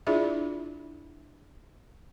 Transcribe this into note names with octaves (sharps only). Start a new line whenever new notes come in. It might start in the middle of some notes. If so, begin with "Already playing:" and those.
D4 E4 F4 G#4 D5 E5